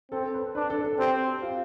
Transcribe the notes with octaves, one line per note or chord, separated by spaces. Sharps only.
C4 A4
B4
D4 B4
A4
A4
C4 G4
F4